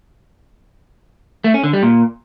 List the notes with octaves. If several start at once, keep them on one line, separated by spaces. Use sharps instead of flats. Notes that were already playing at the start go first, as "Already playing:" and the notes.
A3
C#4
D3
G3
A#2